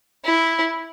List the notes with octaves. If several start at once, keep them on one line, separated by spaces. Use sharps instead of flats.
E4